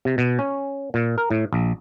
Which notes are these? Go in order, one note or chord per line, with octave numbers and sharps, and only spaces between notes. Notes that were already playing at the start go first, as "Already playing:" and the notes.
C3
B2
C#4
A#2
A#4
A2
A#1